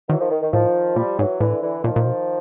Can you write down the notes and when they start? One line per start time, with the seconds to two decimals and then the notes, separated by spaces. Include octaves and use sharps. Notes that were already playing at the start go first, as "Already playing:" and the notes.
0.09 D#3 E3 F#3
0.20 D#3 F3
0.31 D#3
0.41 D#3
0.53 A2 D#3 F3
0.96 A#2 F3 G3
1.18 G#2 E3 F#3
1.40 A2 D3 E3
1.62 D3 E3
1.84 A#2 D#3 F3
1.96 A#2
2.06 B2